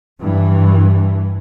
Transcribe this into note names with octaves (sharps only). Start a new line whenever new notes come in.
G2 E3